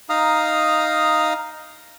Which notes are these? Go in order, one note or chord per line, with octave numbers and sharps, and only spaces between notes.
D#4 F5 A#5 D#6